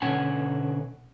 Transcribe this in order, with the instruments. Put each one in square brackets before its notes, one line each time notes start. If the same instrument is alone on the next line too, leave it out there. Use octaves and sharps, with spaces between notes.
[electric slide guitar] B2 D3 C#4 F#5 G#5